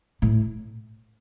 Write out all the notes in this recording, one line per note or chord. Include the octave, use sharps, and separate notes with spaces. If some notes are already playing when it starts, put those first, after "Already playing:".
A2